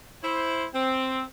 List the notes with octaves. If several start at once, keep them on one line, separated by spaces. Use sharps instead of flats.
E4 C5
C4